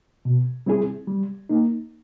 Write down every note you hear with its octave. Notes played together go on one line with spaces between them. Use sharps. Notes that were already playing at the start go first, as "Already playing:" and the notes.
B2
G3 C4 E4 G#4
G3
A#3 D#4